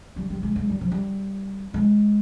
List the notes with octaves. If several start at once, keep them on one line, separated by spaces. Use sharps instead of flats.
G3
G3
G#3
G#3
G3
F3
G3
G#3